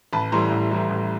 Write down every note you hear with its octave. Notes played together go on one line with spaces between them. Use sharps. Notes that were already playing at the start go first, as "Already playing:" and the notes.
A1 A5 B5
A2 E3 G3 A#5 C6
A1
A2 E3 G3
A1